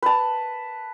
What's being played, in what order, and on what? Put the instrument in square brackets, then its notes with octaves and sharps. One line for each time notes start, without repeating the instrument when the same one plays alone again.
[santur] B4 A5